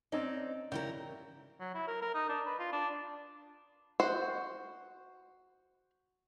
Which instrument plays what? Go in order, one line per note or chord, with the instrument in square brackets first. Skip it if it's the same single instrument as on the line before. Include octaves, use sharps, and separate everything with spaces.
[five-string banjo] C4 C#4 D#4 [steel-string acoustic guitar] D5
[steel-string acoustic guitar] C#3 E4 A#4 [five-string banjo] G4
[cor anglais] F#3
E4
A#4
A#4
D#4
D4
B4
F4
D4
[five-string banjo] F#4 C5